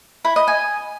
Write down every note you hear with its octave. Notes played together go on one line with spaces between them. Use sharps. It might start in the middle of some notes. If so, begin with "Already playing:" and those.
E4
D#5
G#5